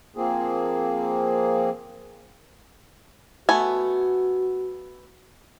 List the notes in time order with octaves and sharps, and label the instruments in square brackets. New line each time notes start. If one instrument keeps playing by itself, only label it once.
[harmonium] F3 A#3 C4 G#4
[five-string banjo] A3 B3 G#5 [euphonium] F#4